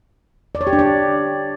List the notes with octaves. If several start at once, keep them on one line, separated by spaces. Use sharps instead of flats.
D5
C#5
G4
D4
D5